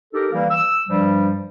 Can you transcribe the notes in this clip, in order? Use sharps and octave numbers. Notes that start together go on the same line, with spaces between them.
D#4 G4 A4 A#4
E3 G3 A#3
E6
G2 F3 G3